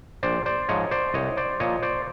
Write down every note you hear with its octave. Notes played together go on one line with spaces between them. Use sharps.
A#1 C5 D5
C5 D5
G#2 F3 C#5 D#5
C5 D5
C2 C#5 D#5
C5 D5
A#2 F3 C#5 D#5
C5 D5